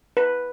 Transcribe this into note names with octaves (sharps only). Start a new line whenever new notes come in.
B4